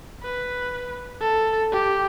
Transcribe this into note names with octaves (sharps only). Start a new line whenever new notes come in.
B4
A4
G4